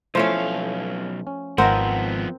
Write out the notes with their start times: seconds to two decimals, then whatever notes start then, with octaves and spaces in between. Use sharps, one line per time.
0.15 B1 F3 A3 C#4 E4 F5
1.27 C#4
1.58 G#1 F3 B3 C4 A#4 D#5 F#5